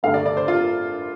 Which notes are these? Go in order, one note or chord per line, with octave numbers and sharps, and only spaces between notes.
G1 G2 D3 A3 D4 F5
D5
D5
C5
F4